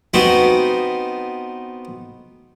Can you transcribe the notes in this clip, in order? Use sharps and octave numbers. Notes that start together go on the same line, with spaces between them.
B3 C4 D#4 F4 F#4